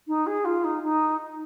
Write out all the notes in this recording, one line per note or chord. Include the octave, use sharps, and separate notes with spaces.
D#4
G#4
F4
D#4
D#4